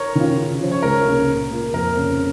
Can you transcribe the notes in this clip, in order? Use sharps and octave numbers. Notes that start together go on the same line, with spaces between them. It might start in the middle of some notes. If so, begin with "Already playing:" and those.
Already playing: A#4 C#5
D#3 C#4 F4
C#3
F3 C#4
C#5
C#2 A#4
C#3 A#3
A#2
A#3 F4 A#4
F2 A#4
C#3 A#3 C#4